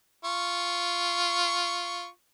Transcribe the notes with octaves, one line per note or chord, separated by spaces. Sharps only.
F4 C#6